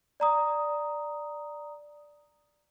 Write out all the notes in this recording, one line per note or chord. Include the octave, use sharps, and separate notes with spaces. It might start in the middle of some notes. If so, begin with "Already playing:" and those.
D5 A#5 D#6